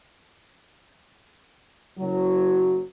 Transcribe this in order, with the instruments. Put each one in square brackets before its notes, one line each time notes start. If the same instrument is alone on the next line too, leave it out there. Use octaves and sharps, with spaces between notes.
[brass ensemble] F#1 F#3